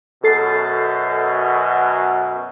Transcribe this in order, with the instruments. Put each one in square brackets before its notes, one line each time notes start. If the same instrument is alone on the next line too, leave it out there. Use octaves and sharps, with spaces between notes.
[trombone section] F#2 B2 [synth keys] A4 A6 C7